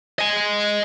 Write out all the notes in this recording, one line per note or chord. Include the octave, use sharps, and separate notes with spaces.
D#5 G#5